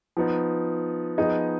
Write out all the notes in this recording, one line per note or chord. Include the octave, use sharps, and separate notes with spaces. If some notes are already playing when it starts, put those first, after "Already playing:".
F3 B3 D#4
F3 B3 D#4 G#4 D#5